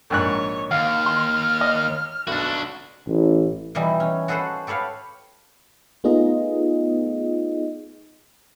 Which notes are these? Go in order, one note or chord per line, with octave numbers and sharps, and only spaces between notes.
A#1 G#2 C#5 F#6
D#2 F5 F6
C6
D#5
B1 D4 F#4
A1
B2 E3 G3 D#4 E4
C#4
F#4 G#4 A4 B4 C5 F#5
G4 A4 B4 C#5 F5
A3 B3 D#4 F4 G#4 D#5